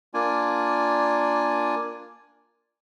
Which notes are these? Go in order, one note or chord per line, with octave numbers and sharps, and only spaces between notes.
A#3 D4 F4 D5 G#5